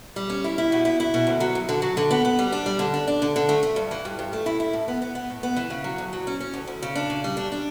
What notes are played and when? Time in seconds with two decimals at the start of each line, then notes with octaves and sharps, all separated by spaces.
0.16 G3
0.30 C#4
0.44 E4
0.58 E4
0.72 B2
0.85 E4
1.00 E4
1.14 B2
1.27 D2
1.40 F#3
1.55 D2
1.69 D3
1.82 F#3
1.97 D3
2.11 B3
2.25 B3
2.39 G3
2.52 D4
2.66 G3
2.79 D3
2.94 D4
3.08 D4
3.22 D3
3.36 D3
3.49 A3
3.63 A3
3.76 G2
3.91 E3
4.05 G2
4.19 G2
4.33 A3
4.46 E4
4.60 E4
4.73 A2
4.88 B3
5.02 B3
5.15 B3
5.30 A2
5.43 B3
5.56 E3
5.70 C#3
5.84 F#3
5.98 D2
6.13 F#3
6.27 C#4
6.40 C#4
6.54 D2
6.67 D2
6.82 C#3
6.95 D4
7.10 C#3
7.24 G3
7.37 D4
7.52 D4